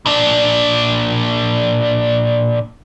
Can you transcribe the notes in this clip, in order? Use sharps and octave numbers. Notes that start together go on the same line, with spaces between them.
A#2 D4